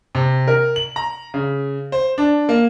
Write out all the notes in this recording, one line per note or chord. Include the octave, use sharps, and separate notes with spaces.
C3
A#4
F#7
A#5
C#3
C5
D4
A#3